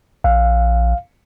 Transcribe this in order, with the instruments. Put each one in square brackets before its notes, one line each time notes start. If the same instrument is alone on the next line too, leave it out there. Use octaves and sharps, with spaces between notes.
[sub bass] A#1 [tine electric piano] F5